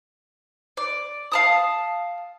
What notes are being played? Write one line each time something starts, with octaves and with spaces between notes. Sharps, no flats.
D5
F5 A5 D#6